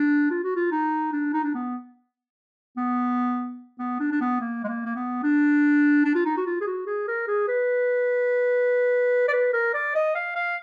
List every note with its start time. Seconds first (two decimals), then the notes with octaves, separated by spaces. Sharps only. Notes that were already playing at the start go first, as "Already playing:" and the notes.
Already playing: D4
0.31 F4
0.44 F#4
0.56 F4
0.71 D#4
1.12 D4
1.33 D#4
1.44 D4
1.54 B3
2.77 B3
3.79 B3
4.00 D4
4.12 D4
4.21 B3
4.41 A#3
4.64 G#3
4.68 A#3
4.85 A#3
4.96 B3
5.23 D4
6.05 D4
6.15 F4
6.25 D#4
6.37 F#4
6.46 F4
6.61 G#4
6.66 F#4
6.86 G#4
7.08 A#4
7.27 G#4
7.48 B4
9.28 D5
9.33 B4
9.53 A#4
9.74 D5
9.95 D#5
10.15 F5
10.36 F5